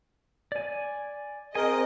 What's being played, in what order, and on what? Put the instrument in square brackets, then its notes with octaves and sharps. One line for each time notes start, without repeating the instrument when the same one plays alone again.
[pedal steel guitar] D5 G#5
[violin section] C4 D#5 [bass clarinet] G#4 [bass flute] A#4 [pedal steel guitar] G5 G#5